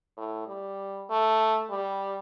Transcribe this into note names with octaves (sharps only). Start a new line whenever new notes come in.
A2
G3
A3
G3